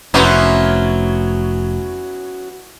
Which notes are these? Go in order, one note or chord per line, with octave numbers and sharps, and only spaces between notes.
F1 F#3 B3 C#4 E4 C5 C6